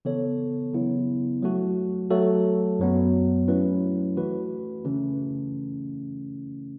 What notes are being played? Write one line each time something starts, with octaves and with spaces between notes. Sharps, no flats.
C#3 E3 B3 A4 C#5
C#3 F#3 B3 E4
F#3 A3 F#4
F#3 A3 F#4 A4
F#2 F#3 B3
F#3 A3 C#4 E4 B4
E3 A3 F#4 B4
C#3 E3 A3 C#4